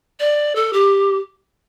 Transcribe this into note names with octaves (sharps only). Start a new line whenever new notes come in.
D5
A4
G4